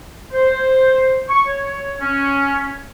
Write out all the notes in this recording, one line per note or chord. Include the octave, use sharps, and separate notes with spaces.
C5
C#6
C#5
C#4